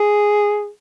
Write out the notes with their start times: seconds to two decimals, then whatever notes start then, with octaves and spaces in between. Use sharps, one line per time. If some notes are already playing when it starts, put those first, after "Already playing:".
Already playing: G#4